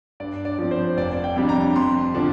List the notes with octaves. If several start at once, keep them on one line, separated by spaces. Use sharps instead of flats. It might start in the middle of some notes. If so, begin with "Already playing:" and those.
G2 D5
D5
F3 C4
C5
F1 D5
G5
F2 C3 G3 D4
A#5
F2 C6
D3 F3 D4